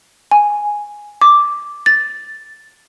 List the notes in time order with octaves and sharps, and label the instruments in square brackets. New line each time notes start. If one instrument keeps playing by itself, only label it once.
[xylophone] G#5
D6
A6